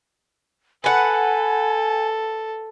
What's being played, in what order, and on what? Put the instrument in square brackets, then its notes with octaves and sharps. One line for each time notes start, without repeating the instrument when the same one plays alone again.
[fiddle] A4 [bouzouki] B4 F#5 [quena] G#5